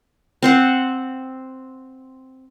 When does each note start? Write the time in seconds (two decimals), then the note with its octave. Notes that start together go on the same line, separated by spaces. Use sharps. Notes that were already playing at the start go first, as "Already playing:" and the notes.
0.43 C4 C5 F#5